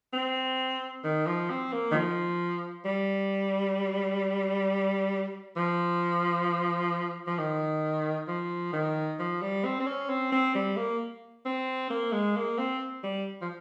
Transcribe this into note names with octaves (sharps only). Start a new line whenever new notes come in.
C4
D#3
F3
C4
A#3
D#3
F3
G3
F3
F3
D#3
F3
D#3
F3
G3
C4
C4
C#4
C4
C4
G3
A#3
C4
A#3
G#3
A#3
C4
G3
F3